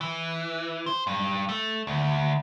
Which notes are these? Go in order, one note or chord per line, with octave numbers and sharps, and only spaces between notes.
E3
C5
G2
A3
D2